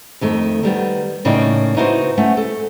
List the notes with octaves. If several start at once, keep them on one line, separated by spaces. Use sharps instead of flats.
F2 D#3 A3
D#3 G3 B3
A2 C#3 A#3 D#4 D5 G5
B3 D#4 E4 F#4 G4 C5
A3 C#4 F#5
A4